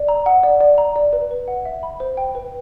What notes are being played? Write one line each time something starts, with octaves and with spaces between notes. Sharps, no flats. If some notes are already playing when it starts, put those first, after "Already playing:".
Already playing: D5
A#5
F#5
D5
D5
A#5
D5
B4
B4
F#5
E5
B5
C5
G5
B4